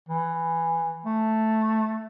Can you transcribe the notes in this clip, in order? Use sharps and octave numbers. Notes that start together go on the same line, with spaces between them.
E3
A3